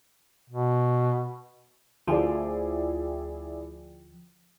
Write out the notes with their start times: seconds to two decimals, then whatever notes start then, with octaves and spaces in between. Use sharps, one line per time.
0.50 B2
2.07 D2 F3 E4 G#4 D5 G5